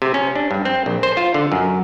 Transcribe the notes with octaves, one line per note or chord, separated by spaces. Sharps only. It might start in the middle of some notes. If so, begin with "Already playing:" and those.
C3
C#4
D4
G2
C4
A#1
C5
F4
D3
F#2